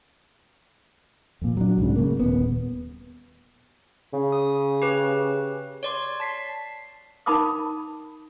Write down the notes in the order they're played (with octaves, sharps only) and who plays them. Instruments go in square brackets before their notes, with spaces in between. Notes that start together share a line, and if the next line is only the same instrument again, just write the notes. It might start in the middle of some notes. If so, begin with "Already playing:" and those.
[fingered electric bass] F2 A#2
F#3 D4
C2 G#2 C#3
C#3 A#3
D#1 C#2 B3
[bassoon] C#3
[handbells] D#6
G4 B4
C#5 D5 C6
A5 B6 C7
[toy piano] D#4 A#4 A5 B5 D6 D#6